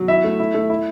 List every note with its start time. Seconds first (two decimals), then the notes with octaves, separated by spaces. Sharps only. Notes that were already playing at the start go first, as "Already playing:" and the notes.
Already playing: F#3
0.08 E4 E5
0.24 A3
0.40 E4
0.54 A3
0.70 E4